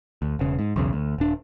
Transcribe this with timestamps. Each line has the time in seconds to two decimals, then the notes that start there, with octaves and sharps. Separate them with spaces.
0.22 D2
0.39 E1 C#3
0.59 G#2
0.76 B1 E2 C#3
0.93 D2
1.18 D#1 D4